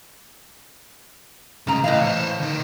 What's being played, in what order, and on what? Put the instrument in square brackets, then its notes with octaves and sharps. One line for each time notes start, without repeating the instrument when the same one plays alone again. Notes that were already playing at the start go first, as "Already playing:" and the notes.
[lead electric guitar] C2 G#2 [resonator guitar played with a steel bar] C#3 A#5
[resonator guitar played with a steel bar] A2 D#5 F5 [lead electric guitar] E3
[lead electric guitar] C5 C#5
D3 D#4